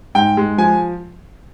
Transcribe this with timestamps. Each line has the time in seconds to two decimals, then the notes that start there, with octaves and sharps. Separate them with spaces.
0.15 G#2 G5
0.37 G#3
0.58 F3 G#5